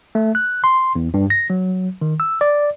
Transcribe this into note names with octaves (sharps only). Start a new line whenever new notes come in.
A3
F#6
C6
E2
G2
A#6
F#3
D#3
E6
D5